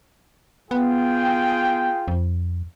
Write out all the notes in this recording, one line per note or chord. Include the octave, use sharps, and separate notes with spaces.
B3 F4 G#4 G5
F2